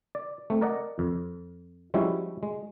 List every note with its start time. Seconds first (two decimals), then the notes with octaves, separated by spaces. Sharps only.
0.15 D5
0.50 A3 C4
0.61 A#4 D5 D#5 F#5
0.99 F2
1.94 F3 G3 G#3 C#4 E4 F#4
2.43 G#3